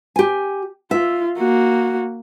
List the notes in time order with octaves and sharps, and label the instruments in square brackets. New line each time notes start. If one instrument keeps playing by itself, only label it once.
[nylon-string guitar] G4 G#5
[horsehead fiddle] F4 [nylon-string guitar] E5
[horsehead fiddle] A#3 F#4